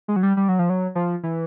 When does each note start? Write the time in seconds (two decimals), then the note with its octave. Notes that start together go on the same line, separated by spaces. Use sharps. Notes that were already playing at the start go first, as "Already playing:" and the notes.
0.08 G#3
0.16 F#3
0.23 G3
0.37 G3
0.48 F#3
0.59 F3
0.70 F#3
0.95 F3
1.23 E3